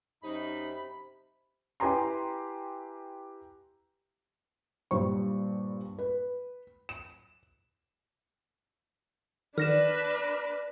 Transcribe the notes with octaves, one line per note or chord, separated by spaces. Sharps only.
F#2 C3 D#4 B5
E4 G4 B4 G#5 A#5 C6
G2 A#2 G3 C5 C#6
B4
E7
D#3 D4 F#4 B4 D5 F6 A#6 E7